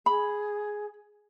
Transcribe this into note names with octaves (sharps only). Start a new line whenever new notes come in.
G#4 B5